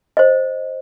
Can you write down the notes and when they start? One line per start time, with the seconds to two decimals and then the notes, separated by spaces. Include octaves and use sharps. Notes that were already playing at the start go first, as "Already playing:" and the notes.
0.17 C5 D#5